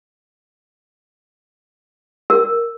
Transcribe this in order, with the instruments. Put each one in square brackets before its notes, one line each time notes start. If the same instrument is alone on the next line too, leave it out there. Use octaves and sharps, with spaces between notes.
[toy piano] A#4